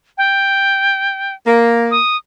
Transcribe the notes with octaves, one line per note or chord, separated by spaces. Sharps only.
G5
A#3
D#6